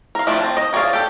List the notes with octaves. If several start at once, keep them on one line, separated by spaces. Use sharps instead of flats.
A#4 F5
F3 G3 A3 D4 E4
C4 A5
D#5
F3 G#4 C#5 D5 F5
G4 A4